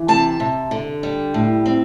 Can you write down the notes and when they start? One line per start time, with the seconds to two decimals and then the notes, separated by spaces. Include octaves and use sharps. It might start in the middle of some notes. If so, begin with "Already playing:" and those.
Already playing: E3
0.08 C3 A5
0.40 C3
0.71 D3
1.03 G3
1.34 A2
1.66 C4